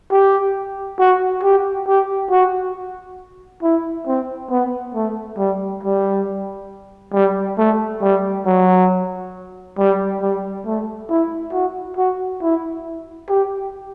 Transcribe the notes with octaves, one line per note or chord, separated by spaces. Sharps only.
G4
F#4
G4
G4
F#4
E4
C4
B3
A3
G3
G3
G3
A3
G3
F#3
G3
G3
A3
E4
F#4
F#4
E4
G4